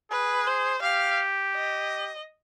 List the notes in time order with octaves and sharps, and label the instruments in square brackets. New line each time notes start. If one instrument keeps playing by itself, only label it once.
[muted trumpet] G#4 [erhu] B4
[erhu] C5
[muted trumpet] G4 [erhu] F5
[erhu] D#5